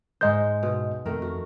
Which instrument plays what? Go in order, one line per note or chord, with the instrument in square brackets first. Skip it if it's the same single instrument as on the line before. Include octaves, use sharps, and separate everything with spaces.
[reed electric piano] G#2 D#5 G6 [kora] G#3 D#4 C5
[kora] B2
[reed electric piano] F2 [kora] D#3 A3 A#4
[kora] F#4